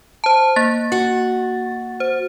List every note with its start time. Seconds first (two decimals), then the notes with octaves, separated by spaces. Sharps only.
0.24 C5 A5
0.56 A#3 A6
0.92 F#4
2.00 C5